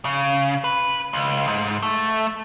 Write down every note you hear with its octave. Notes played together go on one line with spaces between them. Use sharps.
C#3
B4
C#2
G#2
A3